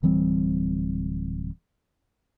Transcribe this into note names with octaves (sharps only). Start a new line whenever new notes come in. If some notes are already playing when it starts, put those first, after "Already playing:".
D1 E3 G3 C4